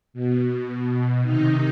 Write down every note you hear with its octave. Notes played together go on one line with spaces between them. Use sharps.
B2
C3 D#3 D#4